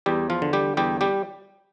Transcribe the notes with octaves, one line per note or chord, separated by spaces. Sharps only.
E2 G3 G4
F3 F4
D3
G3 G4
E2 G3 G4
G3 G4